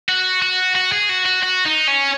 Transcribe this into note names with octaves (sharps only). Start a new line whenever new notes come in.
F#4
F#4
F#4
G#4
F#4
F#4
F#4
D#4
C#4